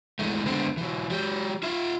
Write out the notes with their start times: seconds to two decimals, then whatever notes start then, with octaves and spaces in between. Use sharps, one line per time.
0.19 E3 G#3 A3
0.46 D3 G#3 B3 C4
0.77 E3 F#3
1.10 F#3 G4
1.63 F4 E5